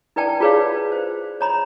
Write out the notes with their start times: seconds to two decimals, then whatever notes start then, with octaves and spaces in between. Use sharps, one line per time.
0.16 E4 B4 D5 G5 A5
0.40 F4 G#4 B4 C#5 D5 F5
0.92 C5
1.41 C#5 A#5 B5